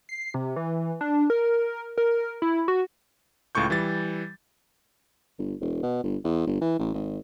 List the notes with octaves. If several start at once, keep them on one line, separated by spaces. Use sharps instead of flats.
C7
C3
E3
D4
A#4
A#4
E4
F#4
C#2 A2 F4 C#6 G6
E3 G3 A6
G1
E1
B2
G1
E2
G1
E3
A1
G#1